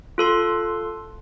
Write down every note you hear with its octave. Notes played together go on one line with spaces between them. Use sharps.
F4 A4 C6